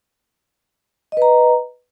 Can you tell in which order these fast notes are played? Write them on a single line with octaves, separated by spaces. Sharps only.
D#5 B4 A#5